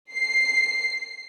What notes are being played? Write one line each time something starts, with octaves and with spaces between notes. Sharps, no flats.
C7